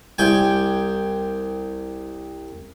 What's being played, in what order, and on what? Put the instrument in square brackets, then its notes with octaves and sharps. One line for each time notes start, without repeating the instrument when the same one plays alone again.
[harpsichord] C2 G5 G#5